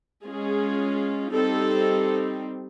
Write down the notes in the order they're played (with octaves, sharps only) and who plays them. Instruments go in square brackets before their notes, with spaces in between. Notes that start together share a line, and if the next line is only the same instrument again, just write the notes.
[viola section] G#3 C#4 F4 G#4
G3 C4 D#4 A4